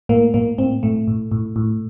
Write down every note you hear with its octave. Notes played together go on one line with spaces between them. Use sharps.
A2 A#3
A2 A#3
A2 C4
A2 A3
A2
A2
A2